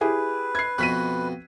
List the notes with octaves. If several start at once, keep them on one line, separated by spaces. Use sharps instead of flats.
E4 G4 G#4 B4
G#6 C7
F2 B2 F#6 B6 D#7